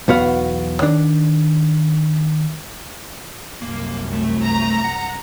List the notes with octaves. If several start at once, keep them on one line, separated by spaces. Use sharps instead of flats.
B1 E2 B3 F#4 F5
D#3 D4
C2 F#2 A#3
A3
A#5
F#5